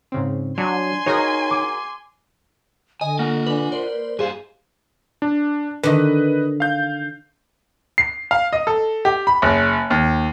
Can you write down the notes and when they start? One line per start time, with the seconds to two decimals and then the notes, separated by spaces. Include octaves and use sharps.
0.12 G#2 C#3 C4
0.58 F#3 D4 G#5 C6
1.06 D#4 F#4 G#4 A#4 C#5
1.50 D6
3.01 D3 D#5 G#5
3.19 A#3 F4 F#5
3.46 D4 B4 D5 G#5 F#7
3.72 A#4 C5 D5
4.19 G2 G4 G#4 C5 F5
5.22 D4
5.83 D3 D#3 B4 D#5
6.60 F5 G6
7.98 C7
8.31 F5
8.53 D#5
8.67 A4
9.05 G4
9.27 B5
9.42 F#1
9.90 D#2